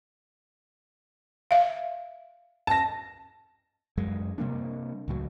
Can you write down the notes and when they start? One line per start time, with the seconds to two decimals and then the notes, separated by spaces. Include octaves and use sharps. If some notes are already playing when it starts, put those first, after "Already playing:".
1.51 E5 F5
2.67 A5 A#6
3.97 F#2 F#3 G#3
4.38 C3 G3 A#3 D4
5.08 C#2 A2 F#3